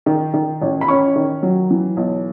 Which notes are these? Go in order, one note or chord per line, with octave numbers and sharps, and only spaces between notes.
D#3
D#3
A1
B5
C#4 C#6
D#3
F#3
E3
B1